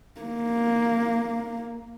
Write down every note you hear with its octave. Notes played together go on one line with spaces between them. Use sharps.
A#3